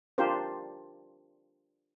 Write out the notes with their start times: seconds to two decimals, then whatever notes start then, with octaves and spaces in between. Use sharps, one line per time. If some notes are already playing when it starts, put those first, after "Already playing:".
0.18 D4 F4 G4 A#4 C5